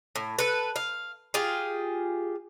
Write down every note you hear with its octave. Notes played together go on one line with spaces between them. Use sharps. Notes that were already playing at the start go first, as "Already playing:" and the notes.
A2
A4 B4
F5
F4 G4 G#4